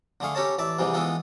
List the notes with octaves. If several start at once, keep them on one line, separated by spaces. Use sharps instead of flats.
D3 A3 G#4 F5 C#6
C#4 G4 A4 A#4 C#5 A5
A1 D5 E5 A5
G#2 C3 E3 G3 G#3
E3 G#3 B3 E4 F4 A4